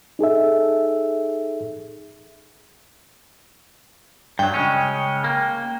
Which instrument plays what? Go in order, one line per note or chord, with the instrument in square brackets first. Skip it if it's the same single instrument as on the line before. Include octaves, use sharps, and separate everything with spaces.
[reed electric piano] D#4 G#4 A4 E5
[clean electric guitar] G2 F#3 [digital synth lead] G5
[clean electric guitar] C#3 G#3 C#4
A#3